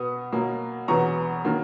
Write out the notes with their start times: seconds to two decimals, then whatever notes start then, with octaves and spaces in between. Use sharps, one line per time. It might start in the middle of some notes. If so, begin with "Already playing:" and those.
Already playing: B2 B3 D#6
0.32 B2 F#3 A#3
0.88 E2 B2 F#3 B3 A#5 C#6
1.45 D#3 F#3 A#3